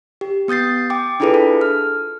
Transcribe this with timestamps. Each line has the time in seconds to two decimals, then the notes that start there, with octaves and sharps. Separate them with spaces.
0.21 G4
0.48 B3 D#6 G6 A6 C7
0.90 G5 D6
1.20 D4 E4 F4 G#4 A4 B4
1.34 A4
1.61 F6